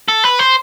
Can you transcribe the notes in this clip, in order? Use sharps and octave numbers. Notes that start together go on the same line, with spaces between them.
A4
B4
C5